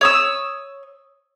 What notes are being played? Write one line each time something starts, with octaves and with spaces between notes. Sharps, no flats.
C#5 D#6 E6